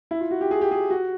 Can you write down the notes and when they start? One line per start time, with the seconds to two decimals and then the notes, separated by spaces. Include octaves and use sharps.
0.11 E4
0.21 F4
0.31 F#4
0.41 G4
0.51 G#4
0.61 G4
0.71 G#4
0.90 F#4